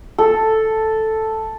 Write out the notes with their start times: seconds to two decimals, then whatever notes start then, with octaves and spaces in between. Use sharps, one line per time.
0.18 A4